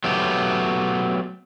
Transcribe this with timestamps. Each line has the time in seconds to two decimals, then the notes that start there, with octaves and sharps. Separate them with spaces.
0.04 F#3 A3 B3 G4